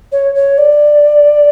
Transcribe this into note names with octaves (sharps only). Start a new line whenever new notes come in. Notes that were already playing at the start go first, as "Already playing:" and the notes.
C#5
C#5
D5